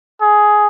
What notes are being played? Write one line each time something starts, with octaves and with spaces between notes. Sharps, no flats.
G#4